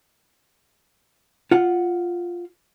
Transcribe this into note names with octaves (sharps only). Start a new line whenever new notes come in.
F4 F#5